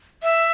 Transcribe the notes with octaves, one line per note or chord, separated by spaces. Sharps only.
E5